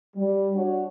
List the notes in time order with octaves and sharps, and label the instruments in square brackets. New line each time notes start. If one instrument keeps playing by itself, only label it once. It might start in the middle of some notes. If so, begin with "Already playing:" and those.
[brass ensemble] G3
D4 F#4 C#5